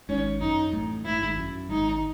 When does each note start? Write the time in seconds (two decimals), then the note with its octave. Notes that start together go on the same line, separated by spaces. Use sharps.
0.09 G#1 G#2 C#4
0.41 F#2 D#4
0.73 A1 A2
1.05 G#2 E4
1.13 A2
1.22 G#1 G#2
1.37 F#2
1.69 G#1 G#2 D#4